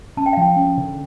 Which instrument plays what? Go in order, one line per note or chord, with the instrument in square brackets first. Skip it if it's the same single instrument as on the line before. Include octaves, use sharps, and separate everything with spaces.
[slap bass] C#4 [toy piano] A5
[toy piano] G5
F5
[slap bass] F3 [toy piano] G5
[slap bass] C#4
D3